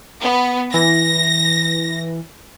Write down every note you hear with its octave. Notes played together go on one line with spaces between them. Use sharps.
B3
E3 A#6